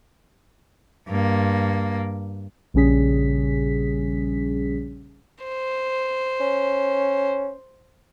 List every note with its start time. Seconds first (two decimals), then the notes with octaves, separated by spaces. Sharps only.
1.08 G2 A#3
2.74 A#1 C#3 G3 C#4 G#4 B6
5.44 C5
6.41 C#4